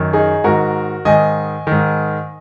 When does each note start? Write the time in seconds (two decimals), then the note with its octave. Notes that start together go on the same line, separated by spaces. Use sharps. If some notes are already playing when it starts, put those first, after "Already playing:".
Already playing: F#2 D#3
0.13 D#4 G#4
0.44 G#2 D#3 F#4 A#4
1.05 G#2 D#3 D#5 G#5
1.67 G#2 D#3